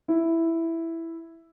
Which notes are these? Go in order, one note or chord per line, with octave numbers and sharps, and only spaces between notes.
E4